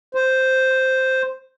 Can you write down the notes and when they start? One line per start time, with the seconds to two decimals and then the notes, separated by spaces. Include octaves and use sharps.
0.15 C5